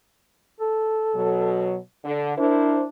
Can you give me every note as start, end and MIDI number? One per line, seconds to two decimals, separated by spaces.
0.60 1.70 69
1.15 1.78 47
1.15 1.78 54
2.05 2.36 50
2.38 2.87 62
2.38 2.84 64
2.38 2.84 70
2.38 2.84 72